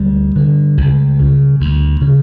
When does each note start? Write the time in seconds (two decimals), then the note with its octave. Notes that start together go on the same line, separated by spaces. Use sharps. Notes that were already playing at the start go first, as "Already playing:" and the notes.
Already playing: D2 G3
0.36 D3
0.77 C#2
1.19 C#3
1.61 D2
2.01 C#3